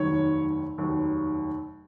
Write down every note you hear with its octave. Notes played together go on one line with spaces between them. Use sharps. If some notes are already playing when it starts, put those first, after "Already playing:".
Already playing: F1 D#2 D#3 F#3 C#5
F1 D#2 D#3 F#3